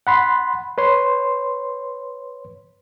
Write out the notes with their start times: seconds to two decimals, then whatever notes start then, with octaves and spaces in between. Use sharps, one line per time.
0.07 F#5 B5 C6
0.78 B4 C#5 C6